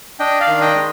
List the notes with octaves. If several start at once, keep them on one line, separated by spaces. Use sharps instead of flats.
D4 D#5 G5
D5 F5
D#3
D#5 G5
G#3